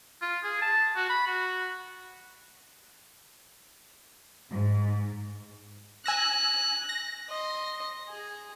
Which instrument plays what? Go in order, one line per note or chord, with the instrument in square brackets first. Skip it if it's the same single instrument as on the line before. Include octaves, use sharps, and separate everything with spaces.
[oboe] F4
G#4
A5
F#4
B5
F#4
[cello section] G#2
[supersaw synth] G#5 E6 A#6 [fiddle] F#6
[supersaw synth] A#6
[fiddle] D#5 C6
G#4